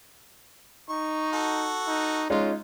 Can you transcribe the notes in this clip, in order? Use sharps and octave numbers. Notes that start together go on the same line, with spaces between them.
D#4 C#6
F#4 A4
D#4
G#3 C#4 D#4 F4